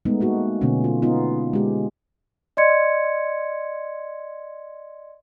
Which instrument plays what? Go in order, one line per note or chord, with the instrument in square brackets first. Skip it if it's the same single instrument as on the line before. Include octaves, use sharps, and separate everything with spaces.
[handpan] G#3 A3 B3 D#4
A#3 D#4 F#4
B2 D3 A3 B3 C#4
F4
B3 D#4 F4
G#3 G4
[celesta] D5 D#5 C6 G#6 C#7